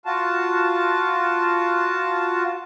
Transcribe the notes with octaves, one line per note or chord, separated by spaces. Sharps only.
F4 F#4 A5